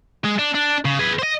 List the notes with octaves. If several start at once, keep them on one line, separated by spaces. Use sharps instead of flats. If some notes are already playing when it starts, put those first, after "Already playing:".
G#3
D4
D4
C#3
G#4 B4
C5 D#5